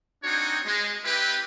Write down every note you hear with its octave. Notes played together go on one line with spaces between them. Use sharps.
C4 D4 D#4 F#4 C#5
G#3
C4 E4 G4 B4